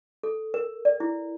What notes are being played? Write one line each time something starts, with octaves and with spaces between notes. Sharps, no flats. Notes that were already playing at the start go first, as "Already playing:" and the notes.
A4
A#4
D5
E4